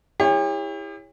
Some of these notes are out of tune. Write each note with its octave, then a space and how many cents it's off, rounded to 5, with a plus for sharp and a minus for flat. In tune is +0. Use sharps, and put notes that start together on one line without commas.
E4 -10 G4 +45 C#5 +0